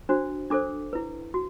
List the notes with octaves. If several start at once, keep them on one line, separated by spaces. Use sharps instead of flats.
D4 F#4 C5
D4 A4 C5 D6
E4 B4
F#4